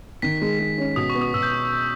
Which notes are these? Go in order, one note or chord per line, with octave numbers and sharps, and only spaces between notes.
D#3 B6
G#3
G#3
C#4
B2 D#6
C#6
B3
D#6
B2 E6
G6